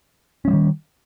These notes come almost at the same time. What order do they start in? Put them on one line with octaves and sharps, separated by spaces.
C#4 G#3 G3 D#3